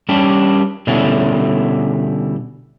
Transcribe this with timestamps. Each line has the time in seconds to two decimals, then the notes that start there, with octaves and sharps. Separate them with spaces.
0.09 G3 C#4 D4 G4
0.87 B2 D3 G3 C#4 E4